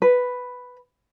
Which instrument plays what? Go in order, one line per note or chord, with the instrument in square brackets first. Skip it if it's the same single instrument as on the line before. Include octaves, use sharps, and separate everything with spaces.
[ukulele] B4